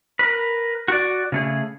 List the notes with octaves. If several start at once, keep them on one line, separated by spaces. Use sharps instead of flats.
A#4 B4
F#4 D5
C#3 A3 G#4